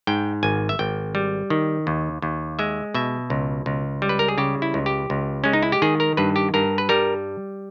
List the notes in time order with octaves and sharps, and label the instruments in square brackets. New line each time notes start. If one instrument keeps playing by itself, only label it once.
[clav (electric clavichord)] G#2 G5
G#1 G#5
E5
G#1 G5
G3
D#3
D#2
D#2
G#3 E5
B2 E5
C#2
C#2
G3
B4
A#4
G#4
C#3 G4
E4
C#2
G4
C#2
G#3 C#4
D#4
E4
G4
D#3 G#4
A#4
G2 B4
G4
G2 A#4
B4
G3 A#4